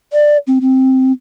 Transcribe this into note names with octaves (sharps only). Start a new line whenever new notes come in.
D5
C4
C4